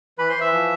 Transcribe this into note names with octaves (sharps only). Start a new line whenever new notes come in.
E3 B4 B5
C5 C6
E3 E5 E6
F3